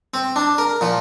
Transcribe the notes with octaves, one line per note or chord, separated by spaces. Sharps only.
C4
D4
A#4
A#2 F3